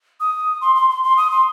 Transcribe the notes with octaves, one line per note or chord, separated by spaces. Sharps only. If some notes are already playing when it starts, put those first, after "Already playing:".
D#6
C6
C6
C6
C6
D#6
C6